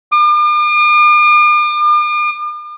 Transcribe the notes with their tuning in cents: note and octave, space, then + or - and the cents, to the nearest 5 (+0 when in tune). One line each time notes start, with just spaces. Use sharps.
D6 +45